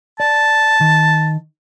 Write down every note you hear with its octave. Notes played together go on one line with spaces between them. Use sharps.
D5 A5
D#3